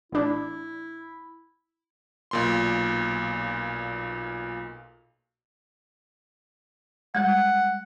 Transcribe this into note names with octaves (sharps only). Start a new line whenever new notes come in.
A1 D4 E4
B1 A#2 C6
G3 G#3 F#5